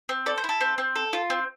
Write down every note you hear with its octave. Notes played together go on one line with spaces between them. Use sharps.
C4
A4 D5
C5
E4
A4
C4
C4
A4
F4
C4